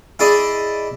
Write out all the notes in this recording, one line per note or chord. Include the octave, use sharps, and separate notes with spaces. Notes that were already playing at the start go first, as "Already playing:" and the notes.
E4 G#4 D5 D#5